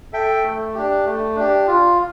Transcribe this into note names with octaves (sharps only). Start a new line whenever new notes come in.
A4 E5 G5
A3
D4 G4
A3
D4 G4
F4